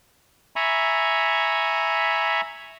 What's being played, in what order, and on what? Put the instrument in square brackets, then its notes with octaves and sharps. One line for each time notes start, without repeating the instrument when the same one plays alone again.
[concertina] E5 G#5 A#5 B5 C#6